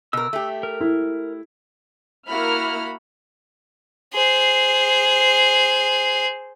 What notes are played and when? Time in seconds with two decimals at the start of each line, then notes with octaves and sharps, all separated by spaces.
0.13 B2 A#4 E6
0.33 A3 G4
0.63 A#4
0.81 E4
2.27 A#3 E4 F#4 B5 F6
4.13 G#4 C5